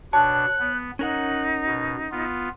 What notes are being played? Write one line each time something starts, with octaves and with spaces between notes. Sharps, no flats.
B2 D4 C#5 A5 F#6
B3
C#4 D#4 A#4 F#5 F#6
B2
B3 F4